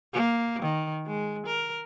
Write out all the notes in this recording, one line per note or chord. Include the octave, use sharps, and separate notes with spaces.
A#3
D#3
G#3
A#4